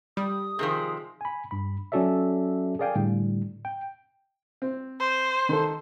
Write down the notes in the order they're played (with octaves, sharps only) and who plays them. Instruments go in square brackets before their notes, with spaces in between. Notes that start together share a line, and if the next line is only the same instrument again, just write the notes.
[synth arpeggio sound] G3 [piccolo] D#6
[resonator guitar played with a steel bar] C3 D#3 F3 [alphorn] G#4
[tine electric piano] G#5 B5
G2 B5
F#3 C#4 F#4 A4 D5 E5
G#4 A#4 D5 F5 G5 G#5
A2 D3 G3
G5
[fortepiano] C4
[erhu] C5
[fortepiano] D#3 A4